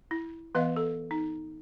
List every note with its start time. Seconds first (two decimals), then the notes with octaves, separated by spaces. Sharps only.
0.11 E4
0.55 E3 B3 B4 D#5 F5
0.76 A4
1.11 D#4